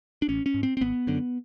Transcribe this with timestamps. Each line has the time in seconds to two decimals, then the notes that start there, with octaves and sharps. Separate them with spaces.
0.22 D4
0.28 A1 C#4
0.46 C#4
0.54 G#2
0.63 C4
0.77 C4
0.81 G#1 B3
1.07 F#2 D3